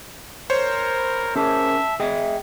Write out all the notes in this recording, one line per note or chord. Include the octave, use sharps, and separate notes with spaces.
A#4 C5 C#5
B5
C#4 G#4 A#4 E5 A5
G#4 D#5 E5 G5